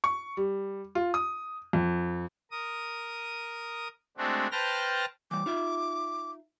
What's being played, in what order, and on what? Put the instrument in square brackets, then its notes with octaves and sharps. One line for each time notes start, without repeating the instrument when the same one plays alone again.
[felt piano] C#6
G3
F4
D#6
F2
[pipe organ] A#4 D#6
G#3 A3 C4 D4 F#4
B4 C5 G5 A5 F6 A#6
[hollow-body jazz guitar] E3 G3 [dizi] D6
[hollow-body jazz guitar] D#4 F4 E5